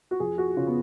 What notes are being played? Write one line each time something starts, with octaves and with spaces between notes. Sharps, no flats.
F#4
F2 G#4
F#4
C#3 F4
B3